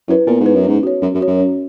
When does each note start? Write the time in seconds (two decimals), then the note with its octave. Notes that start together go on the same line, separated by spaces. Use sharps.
0.08 F#2 E4 B4
0.27 A#2 B3
0.40 G#2
0.46 E4 B4
0.55 F#2
0.64 G#2 C#4
0.83 F#4 C#5
1.02 F#2 C#4
1.15 F#2
1.21 F#4 C#5
1.27 F#2
1.40 C#4